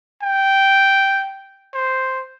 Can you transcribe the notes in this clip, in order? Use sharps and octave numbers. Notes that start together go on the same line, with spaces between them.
G5
C5